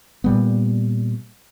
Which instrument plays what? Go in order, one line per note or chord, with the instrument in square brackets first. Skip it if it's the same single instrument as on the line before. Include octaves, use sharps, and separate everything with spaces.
[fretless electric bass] A#2 G3 B3